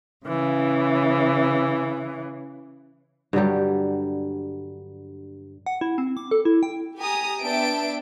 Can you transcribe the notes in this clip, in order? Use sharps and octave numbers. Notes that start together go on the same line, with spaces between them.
C#3 E3
G2 D3 F#3 G3
F#5
E4
C4
D6
A4
E4
G5
G4 G#5 A#5 D#6
B3 D4 E5 G5 A5 D7